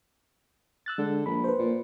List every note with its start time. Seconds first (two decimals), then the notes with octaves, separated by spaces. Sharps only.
0.86 E6 F#6 A6
0.98 D3 G#3
1.26 A#1 B5
1.44 B4 C5
1.59 A#2